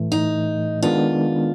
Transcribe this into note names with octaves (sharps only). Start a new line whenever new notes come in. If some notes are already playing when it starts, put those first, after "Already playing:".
Already playing: A2 E3 A3
D#4
D#3 G#3 B3 D4 F4